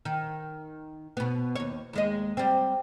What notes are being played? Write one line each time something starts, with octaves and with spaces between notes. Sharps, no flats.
D#3
B2 B3
D#2 C#5
D#2 G#3 D#5
G3 C4